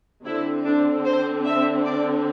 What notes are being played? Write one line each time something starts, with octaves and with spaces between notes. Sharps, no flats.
D3 C4 E4
D4
C5
E5
D5